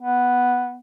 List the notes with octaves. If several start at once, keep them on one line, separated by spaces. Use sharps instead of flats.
B3